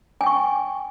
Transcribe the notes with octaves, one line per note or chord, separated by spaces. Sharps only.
G5 G#5 C#6